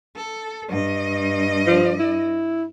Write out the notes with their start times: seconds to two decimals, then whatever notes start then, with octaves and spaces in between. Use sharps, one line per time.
0.16 A4
0.69 G2 D#5
1.67 F3
1.99 E4